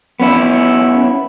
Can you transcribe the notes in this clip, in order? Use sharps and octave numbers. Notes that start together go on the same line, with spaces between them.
B3 C#4 E4